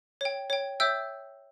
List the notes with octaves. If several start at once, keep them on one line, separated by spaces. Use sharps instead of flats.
C#5 G5
C#5 G5
C#5 E5 G5 E6 G6